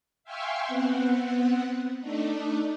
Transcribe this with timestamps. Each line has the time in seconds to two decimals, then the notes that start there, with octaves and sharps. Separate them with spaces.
0.24 E5 F5 G5 G#5 C6 C#6
0.67 B3 C4 F#5
2.00 A3 D4 D#4